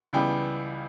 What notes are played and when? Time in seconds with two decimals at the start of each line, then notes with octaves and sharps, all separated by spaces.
0.13 C#2 C#3 E3 G3 B3 G5